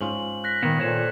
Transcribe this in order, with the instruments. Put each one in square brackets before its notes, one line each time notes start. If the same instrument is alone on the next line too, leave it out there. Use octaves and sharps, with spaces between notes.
[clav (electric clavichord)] G#2 C#4 F4 [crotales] F#7
[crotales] F#6 A#6 B6
[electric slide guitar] A#2 A#3 B3 [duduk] D#3
[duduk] A#2 [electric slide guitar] A4 C5 C#5